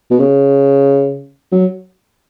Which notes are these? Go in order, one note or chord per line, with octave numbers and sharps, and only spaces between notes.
B2
C#3
F#3